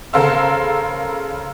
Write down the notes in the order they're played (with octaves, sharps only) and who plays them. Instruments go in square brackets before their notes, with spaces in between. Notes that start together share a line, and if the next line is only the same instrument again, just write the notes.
[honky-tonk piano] C#3 A4 A#4 C5 F5 E6